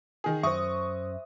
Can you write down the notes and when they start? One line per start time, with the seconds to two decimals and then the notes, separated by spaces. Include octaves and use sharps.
0.24 D#3 G#4
0.43 F#2 C5 E5 C#6 D#6